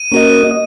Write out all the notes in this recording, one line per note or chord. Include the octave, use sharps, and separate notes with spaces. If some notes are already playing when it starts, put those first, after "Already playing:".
Already playing: D#7
A#3 C#4 F#4 A#4 D#5
D#5